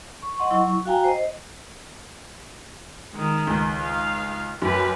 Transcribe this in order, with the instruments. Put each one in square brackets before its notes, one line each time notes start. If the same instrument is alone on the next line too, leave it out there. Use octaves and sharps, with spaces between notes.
[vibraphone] C#6
D#5 F#5 C6 C#6
F#3 E4 C#6
F#4 F5 G5 G#5 A#5
C5 D#5
[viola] D#3 G#3
[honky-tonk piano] C#2
[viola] D#4 F5
[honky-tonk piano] F#2 [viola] G4 B4